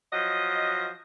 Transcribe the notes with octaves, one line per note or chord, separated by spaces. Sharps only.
F3 F#3 D#5